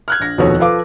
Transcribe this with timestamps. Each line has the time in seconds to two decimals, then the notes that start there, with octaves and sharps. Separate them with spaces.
0.08 F6 F#6 G#6
0.20 A#1 A#6
0.38 D#1 F2 B2 D#3 A4 C#5
0.60 F3 A4 B4 F5 D6